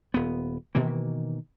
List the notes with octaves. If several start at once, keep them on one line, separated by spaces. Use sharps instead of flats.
D#1 B3
B2 D#3 E3 A#3